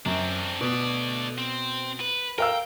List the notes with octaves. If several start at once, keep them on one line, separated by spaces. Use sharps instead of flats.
F#2 C4 D4
B2 A3 D5
C4
B4
A#4 F5 G5 E6